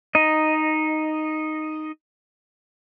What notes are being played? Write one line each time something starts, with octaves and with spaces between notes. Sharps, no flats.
D#4 D#5